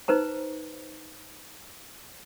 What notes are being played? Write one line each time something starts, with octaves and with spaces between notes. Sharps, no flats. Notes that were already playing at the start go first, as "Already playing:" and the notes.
D#4 B4 C5 A#5